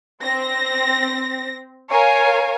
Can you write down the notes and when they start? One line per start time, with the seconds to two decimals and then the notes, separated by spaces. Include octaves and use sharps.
0.22 C4 A#6
1.89 A#4 C#5 F5 G#5